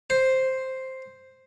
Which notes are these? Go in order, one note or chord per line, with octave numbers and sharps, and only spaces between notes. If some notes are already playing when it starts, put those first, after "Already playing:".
C5